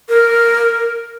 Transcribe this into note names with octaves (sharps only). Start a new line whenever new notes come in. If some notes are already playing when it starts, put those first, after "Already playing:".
A#4